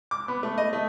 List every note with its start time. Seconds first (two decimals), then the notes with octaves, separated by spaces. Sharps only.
0.11 D6
0.28 B3
0.43 A3
0.58 D#5
0.73 A3